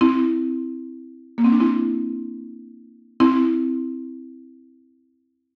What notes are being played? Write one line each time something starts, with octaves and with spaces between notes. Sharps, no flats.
C4 E4
A#3
C4
D4
C4 E4
C4 E4